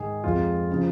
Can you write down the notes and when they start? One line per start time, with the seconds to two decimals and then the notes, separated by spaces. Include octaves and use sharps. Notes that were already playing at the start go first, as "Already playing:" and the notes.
Already playing: G#2 D#3 G#3 G#4
0.23 F2 F3 G#3 F4
0.71 C#3 F3